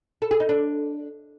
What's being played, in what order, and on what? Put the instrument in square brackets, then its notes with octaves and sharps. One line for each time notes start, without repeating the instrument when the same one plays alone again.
[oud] A4
G#4
D#4
D4